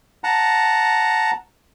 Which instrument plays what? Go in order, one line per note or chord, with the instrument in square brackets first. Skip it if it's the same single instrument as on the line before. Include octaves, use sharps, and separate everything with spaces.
[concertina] F#5 A5 A#5